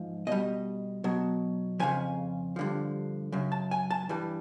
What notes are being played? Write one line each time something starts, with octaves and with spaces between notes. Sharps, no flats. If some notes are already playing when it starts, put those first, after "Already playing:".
Already playing: G#2 F3
B2 G3 D#5
B2 F#3
F2 C#3 F3 G#5
G2 D3 F3
F#2 C#3
A5
G#5
A5
G2 E3 G3